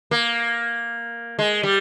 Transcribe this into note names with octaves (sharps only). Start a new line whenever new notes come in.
A#3
G#3
G3